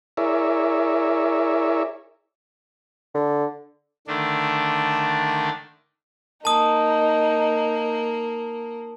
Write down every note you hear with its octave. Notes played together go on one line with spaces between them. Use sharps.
E4 G#4 A#4 C#5 D5 E5
D3
D3 D#3 A3 D4
A#3 D#4 A5 D#6